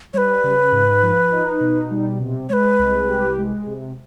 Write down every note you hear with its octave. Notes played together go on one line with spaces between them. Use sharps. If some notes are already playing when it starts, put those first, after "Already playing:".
G3 B4 C#5
C#3
G#2
F3
D#4
B2
G3
C3
G#3 B4 C#5
C2
G4
G#3
C3